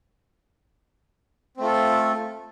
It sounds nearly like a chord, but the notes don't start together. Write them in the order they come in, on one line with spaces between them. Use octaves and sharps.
C4 A3 F4 A4